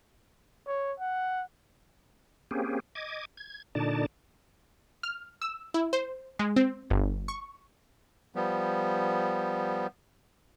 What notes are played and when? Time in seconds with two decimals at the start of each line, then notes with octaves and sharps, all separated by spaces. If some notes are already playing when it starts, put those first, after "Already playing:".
0.67 C#5
0.99 F#5
2.51 A#3 C4 C#4 G4 G#4
2.95 D#5 D6 G#6
3.37 G#6
3.75 A#2 D3 D4 D#4 D5 A5
5.03 F6
5.42 E6
5.74 E4
5.93 C5
6.39 G#3
6.56 C4
6.90 G1
7.28 C#6
8.35 F3 G3 B3